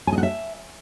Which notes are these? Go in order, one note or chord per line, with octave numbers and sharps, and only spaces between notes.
G#5
D#5
F#5
E5